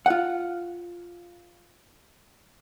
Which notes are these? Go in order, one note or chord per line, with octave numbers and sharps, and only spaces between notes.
F4 F#5